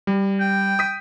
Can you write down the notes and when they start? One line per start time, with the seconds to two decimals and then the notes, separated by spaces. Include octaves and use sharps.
0.07 G3
0.40 G5
0.79 D#6 B6